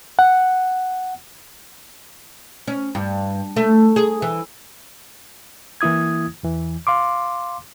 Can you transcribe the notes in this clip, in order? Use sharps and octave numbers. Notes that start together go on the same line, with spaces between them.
F#5
C#4
G2
A3
G#4
E3
E3 A#3 E4 D#6 G#6
E2 E3
F5 C6 D6